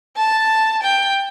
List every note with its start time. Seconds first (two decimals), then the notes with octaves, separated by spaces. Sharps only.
0.17 A5
0.82 G5